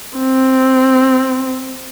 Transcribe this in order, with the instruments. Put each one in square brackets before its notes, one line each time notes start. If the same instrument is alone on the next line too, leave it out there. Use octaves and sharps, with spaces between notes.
[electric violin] C4